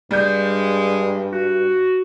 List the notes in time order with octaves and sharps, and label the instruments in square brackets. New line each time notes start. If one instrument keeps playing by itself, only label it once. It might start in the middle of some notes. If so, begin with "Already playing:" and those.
[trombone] G2 [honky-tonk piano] G3 G6 [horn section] G#3
[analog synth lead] F#4